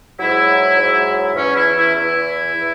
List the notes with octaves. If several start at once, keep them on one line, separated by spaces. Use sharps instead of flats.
G#2 F#3 E4
G#2 F#3
E2 E3 C#4
E4
E4
E2 E3 E4
E3